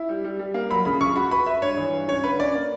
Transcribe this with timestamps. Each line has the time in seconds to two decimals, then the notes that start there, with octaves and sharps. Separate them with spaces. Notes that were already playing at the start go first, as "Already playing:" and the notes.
Already playing: E4
0.09 G3
0.24 G3
0.39 G3
0.54 A#3
0.70 F#3 B5
0.85 C#3 B5
1.01 C#3 C#6
1.16 F#4 B5
1.31 B4 B5
1.46 B4 E5
1.62 G2 C#5
1.78 E3
1.93 G2
2.08 C#4 C#5
2.24 D3 B4
2.39 C#4 D5
2.55 A#3